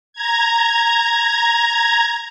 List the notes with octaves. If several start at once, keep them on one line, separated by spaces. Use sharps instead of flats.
A#5 G#6